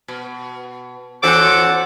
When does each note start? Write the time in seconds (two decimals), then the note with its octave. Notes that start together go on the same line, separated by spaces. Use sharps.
0.08 B2
1.23 E2 C#4 F#4 A4 C5 F#5 D6